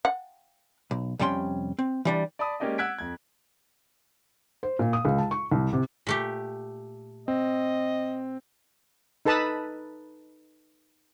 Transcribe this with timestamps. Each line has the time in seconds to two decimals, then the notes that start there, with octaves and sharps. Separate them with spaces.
0.05 F#5
0.91 B1
1.19 F2 C3 G3 C#4 G5 C6
1.79 C4
2.05 E3 G3 D4
2.39 D5 A5 B5 D#6
2.60 G#3 A#3 C#4 G4 D5 D#5
2.78 F#5 E6 F#6 G#6 B6 D7
2.99 F2 G#6
4.63 C5
4.79 A#2
4.93 D#6
5.05 C#2
5.18 A5
5.31 C#6
5.52 C2
5.73 C3
6.07 A#2 A3 G4
7.28 C4 D#5
9.25 D#4 A4 B4 A5 B5 D#6